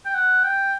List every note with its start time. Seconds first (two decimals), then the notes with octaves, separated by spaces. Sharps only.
0.05 G5
0.15 F#5
0.44 G5